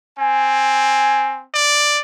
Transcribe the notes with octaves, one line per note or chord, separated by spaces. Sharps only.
C4 G#5
D5